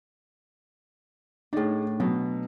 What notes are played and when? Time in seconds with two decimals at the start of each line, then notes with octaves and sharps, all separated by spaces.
1.53 A2 D4 D#4 G#4
2.00 B2 F#3